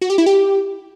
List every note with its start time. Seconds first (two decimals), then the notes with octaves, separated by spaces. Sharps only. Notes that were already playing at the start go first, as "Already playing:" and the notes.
0.01 F#4
0.10 G4
0.18 E4
0.26 G4